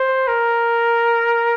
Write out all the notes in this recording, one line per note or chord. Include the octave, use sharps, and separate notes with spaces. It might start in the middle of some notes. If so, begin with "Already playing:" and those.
Already playing: C5
A#4